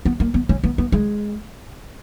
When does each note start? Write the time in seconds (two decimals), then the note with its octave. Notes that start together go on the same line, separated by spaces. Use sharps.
0.05 B3
0.20 A#3
0.34 B3
0.49 C#4
0.64 B3
0.78 B3
0.92 G#3